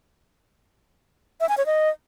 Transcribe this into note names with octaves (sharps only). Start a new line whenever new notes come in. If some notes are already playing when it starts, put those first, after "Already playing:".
E5
G#5
C#5
D#5